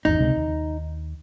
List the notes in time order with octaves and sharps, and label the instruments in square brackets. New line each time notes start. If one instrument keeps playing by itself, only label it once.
[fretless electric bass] G#1 E2 [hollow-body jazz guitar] D#4
[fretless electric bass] C#2 C3 G#3
D#2